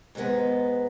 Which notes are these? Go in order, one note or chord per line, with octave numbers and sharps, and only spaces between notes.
G#2 D#3 G#3 B3